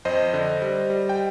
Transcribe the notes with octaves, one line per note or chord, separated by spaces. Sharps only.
F2 C5 D#5
D3
G3
G3
G5